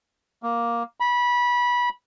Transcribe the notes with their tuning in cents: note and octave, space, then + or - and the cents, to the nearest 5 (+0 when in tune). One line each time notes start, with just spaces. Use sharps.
A#3 +5
B5 -20